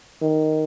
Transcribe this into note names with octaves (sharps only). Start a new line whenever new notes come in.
D#3